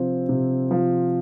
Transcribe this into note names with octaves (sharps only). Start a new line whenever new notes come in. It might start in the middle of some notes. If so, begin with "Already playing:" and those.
Already playing: C3 F3 C4
C3
F3